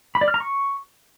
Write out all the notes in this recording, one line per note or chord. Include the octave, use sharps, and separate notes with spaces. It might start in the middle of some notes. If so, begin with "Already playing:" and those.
B5
D5
F6
A#5
C#6